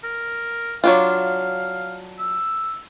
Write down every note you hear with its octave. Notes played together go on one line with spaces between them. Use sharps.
A#4
F#3 D4 F4 F5
E6